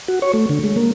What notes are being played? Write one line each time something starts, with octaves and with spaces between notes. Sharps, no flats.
F#4
C#5
A3
D3
G#3
A#3